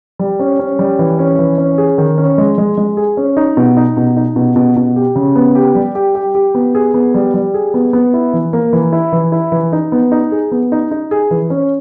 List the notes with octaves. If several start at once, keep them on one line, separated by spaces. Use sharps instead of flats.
G3
C#4
C#4
G3
E3
C#4
E3
C#4
G#4
D#3
C#4
G#3
G#3
G#3
G#4
C#4
D#4
B2
D#4
B2
D#4
B2
B2
B2
G4
C#3
B3
G4
G3
G4
G4
G4
B3
G#4
B3
G3
G3
G#4
B3
B3
E4
E3
A#3
E3
E4
E3
E4
E3
D#4
B3
D#4
G#4
B3
D#4
D#4
G#4
E3
C#4